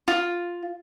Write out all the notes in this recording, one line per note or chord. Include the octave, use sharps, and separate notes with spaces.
F4